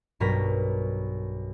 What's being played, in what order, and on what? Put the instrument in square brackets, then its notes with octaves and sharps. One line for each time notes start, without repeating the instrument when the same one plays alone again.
[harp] B1 G2 B2 A#4 A#5 B6